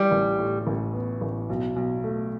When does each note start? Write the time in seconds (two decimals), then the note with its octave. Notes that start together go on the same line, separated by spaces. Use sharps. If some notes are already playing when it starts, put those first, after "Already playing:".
Already playing: E3 G3
0.11 A1
0.39 A2
0.67 A1
0.94 B3
1.21 A1
1.49 B1
1.76 B1
2.04 A3